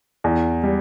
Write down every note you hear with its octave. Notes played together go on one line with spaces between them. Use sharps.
E2
G3